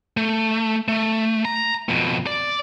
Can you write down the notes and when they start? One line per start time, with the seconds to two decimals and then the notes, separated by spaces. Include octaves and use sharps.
0.17 A3
0.88 A3
1.45 A#5
1.89 F2 B2
2.27 D5